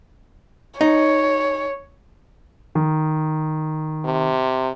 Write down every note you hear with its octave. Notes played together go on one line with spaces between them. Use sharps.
D#4 C#5
D#3
C3